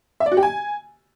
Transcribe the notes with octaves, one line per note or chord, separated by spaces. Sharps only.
E5
D5
F#4
G4
G#5